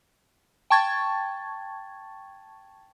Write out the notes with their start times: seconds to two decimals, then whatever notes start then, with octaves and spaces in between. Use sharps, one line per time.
0.70 G5 A5 C#6 G#6 A6